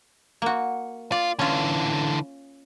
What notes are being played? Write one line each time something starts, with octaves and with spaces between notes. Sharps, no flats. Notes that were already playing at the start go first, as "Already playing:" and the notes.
A#3 F#4
F4 D5
D3 E3 C#4 F4